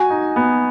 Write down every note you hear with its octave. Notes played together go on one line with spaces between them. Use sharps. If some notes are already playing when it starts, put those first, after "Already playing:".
Already playing: F#4 G#5
D#4
B3